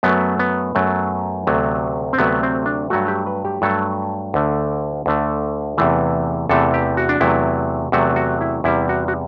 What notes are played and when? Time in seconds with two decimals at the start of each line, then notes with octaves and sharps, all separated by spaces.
0.03 F#2 F#3 A3 B3
0.39 B3
0.75 F#2 F#3 A3
1.47 D2 C3 F#3 A3
2.13 C4
2.18 D2 C3 F#3 A3 B3
2.43 C4
2.66 D4
2.90 G2 F#3 A3 F#4
3.08 G4
3.27 B4
3.45 G4
3.62 G2 F#3 A3 A4
4.34 D2 D3 A3
5.06 D2 D3 A3
5.78 E2 C3 E3 A3
6.49 E2 C3 E3 A3 A4
6.74 G4
6.97 F#4
7.09 D4
7.20 E2 C3 F#3 A3 E4
7.92 E2 C3 F#3 A3 F#4
8.16 F#4
8.41 E4
8.64 E2 C3 G3 E4
8.89 F#4
9.08 F#4